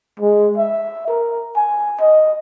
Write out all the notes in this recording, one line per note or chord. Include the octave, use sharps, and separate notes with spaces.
G#3
E5
A#4
G#5
D#5